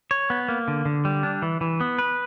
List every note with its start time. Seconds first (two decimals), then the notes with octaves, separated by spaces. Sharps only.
0.11 C#5
0.30 B3
0.48 A#3
0.68 D3
0.85 D3
1.05 G3
1.23 D4
1.42 E3
1.61 E3
1.80 B3
1.98 B4